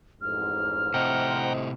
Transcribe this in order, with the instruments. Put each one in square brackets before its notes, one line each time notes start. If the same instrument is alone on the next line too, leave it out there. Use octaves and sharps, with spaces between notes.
[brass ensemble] A1 F2 G#2 [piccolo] F6
[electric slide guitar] A2 C3 [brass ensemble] C5 D#5 [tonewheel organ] F#5 G5 A#5